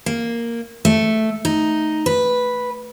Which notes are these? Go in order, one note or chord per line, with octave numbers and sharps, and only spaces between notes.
A#3
A3
D#4
B4